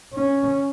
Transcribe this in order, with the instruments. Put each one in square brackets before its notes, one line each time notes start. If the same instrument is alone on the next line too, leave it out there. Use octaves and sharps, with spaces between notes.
[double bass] C#4